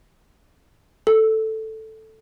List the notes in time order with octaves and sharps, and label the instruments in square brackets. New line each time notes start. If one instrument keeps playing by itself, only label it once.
[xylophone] A4